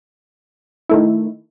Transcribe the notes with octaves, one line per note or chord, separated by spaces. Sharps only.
D#3 A3 E4